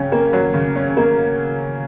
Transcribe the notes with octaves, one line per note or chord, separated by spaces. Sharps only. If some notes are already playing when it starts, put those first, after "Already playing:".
Already playing: C#3 F#3 C#4 G5
A#3
F#3
C#3
C#4
A#3